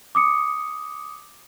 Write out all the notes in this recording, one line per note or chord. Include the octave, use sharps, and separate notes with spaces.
D6 D#6 C#7